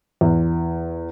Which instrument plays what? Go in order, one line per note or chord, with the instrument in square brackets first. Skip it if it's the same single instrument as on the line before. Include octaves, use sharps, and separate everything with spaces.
[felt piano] E2